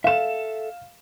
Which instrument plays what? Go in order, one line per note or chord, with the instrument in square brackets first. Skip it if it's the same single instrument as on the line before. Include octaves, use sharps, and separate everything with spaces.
[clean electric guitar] A4 E5 [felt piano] F5 E7